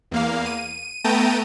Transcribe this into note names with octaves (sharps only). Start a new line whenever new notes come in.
E2 A#3 F5
D#7
A3 B3 G5 A5 A#5 D#7